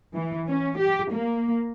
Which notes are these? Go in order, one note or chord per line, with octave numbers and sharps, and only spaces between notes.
E3
C#4
G4
A#3